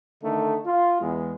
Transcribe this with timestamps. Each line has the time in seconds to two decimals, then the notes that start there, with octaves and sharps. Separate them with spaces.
0.22 D3 D#3 A3 D#4
0.66 F4
1.00 E2 G#3